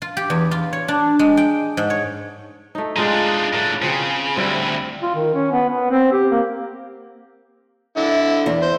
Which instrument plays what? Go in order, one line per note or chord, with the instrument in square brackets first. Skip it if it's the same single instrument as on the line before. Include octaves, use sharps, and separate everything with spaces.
[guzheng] F4
G4
E2
F4
C#5
D4
G#3
G5
G#2
C#5
[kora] A3 D#4
[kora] G#3 F4 G#4 [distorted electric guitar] D4 D#4
[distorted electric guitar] A2 D4 [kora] A#4
[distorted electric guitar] C#3 [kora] F3 C4 G#4
[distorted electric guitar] D2 E4 [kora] G3 C4
[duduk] F4
D#3
C#4
B3
B3
C4
G4
A#3
[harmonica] D3 E4
[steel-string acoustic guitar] E2
[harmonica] C5